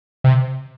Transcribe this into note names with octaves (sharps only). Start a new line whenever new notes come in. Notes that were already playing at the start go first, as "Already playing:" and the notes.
C3